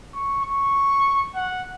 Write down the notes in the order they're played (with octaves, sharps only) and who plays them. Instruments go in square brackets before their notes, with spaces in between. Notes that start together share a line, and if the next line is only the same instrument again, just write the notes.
[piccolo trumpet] C#6
C#6
F#5